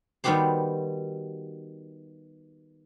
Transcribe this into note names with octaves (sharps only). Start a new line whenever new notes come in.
D#3 G3 B3 F#4 G4 C5